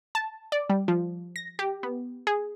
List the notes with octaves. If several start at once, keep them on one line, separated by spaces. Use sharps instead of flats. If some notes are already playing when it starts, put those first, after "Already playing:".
A5
D5
G3
F3
A#6
G4
B3
G#4